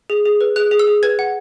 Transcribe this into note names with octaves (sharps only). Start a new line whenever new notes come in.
G#4
G#4
B4
G#4 F#6
G#4
E6
G#4
B4 G#6
F#5